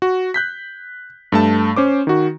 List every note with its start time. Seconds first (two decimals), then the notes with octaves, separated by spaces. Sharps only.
0.02 F#4
0.34 F#6 G6 B6
1.32 G2 A3 A5
1.76 C#4 C5 D6
2.07 D#3 F#4